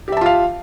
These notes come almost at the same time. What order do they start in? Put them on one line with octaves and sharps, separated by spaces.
G4 E5 A5 F4 F5